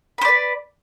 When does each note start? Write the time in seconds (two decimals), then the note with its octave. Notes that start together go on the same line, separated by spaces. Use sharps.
0.18 B5
0.21 C5
0.25 D5
0.28 B4